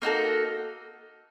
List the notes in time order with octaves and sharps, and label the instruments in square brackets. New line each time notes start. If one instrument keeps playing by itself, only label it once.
[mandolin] A#3 D#4 F#4 A4